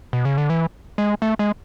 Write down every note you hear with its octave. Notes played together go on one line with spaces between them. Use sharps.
B2
C#3
D3
E3
G#3
A3
G#3